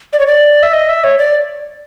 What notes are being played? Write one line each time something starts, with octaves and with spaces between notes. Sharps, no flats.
D5
C#5
D5
E5
D#5
E5
C#5
D5